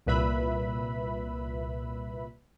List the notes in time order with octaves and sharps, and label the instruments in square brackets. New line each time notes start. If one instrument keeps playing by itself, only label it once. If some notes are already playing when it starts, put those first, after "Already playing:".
[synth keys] C2 A#2 B4 E5 B5